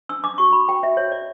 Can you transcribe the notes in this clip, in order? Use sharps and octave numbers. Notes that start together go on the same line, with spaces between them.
D4 E6
D4 D6
F#4 C#6
F#4 B5
F#4 G5
F#4 E5
F#4 C#5
F#4 D5